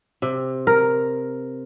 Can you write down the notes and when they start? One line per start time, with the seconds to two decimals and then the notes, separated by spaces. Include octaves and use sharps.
0.22 C3
0.67 A#4